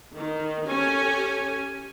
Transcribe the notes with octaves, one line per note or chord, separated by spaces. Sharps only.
D#3
C#4 G4 A4 C#5 G#5